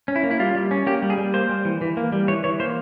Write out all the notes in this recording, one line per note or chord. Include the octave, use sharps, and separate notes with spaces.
C#4
E4
A#3
E4
G3 F4
G3
C#4
A#3 G4
G3
G#4
G3
A#3 C5
G3
E3
E3
A#3
G3
E3 C#5
E3 C#5
A#3 C5